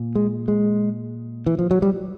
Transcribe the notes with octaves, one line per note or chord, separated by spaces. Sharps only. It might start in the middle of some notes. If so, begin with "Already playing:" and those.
Already playing: A#2
G#3
G#3
E3
F3
F#3
G3